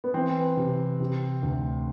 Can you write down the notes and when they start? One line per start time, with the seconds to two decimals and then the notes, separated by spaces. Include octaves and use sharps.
0.04 B3
0.14 E3 C4
0.57 C3
1.00 C3
1.43 D2